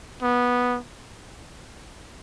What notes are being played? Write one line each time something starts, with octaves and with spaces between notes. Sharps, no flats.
B3